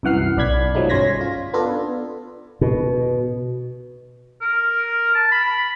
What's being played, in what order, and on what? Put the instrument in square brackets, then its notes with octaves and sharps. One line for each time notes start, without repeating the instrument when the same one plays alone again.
[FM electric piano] C2 F#2 E3 F#5 F6 C7
B1 D5 B5 G#6 B6
F3 F#3 G#3 A3 D#4
G1 C#4 C6 G#6 A#6 B6
F4
B3 D4 F4 A4
[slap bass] B2
[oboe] A#4
A5
B5